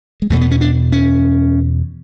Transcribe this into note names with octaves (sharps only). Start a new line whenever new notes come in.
G#3
E2 B2 A3
B3
C#4
D4
C#4